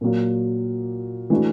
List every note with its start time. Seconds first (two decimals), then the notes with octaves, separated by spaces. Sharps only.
0.01 A#2 F#3 A#3
1.30 E3 A3 D4 F#4